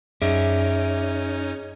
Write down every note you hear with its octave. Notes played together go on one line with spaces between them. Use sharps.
F#2 C#4 D#4 G#4 D5 E5